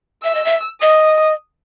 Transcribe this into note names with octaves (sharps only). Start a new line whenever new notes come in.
E5 E6
D#5
E5
D#5 D#6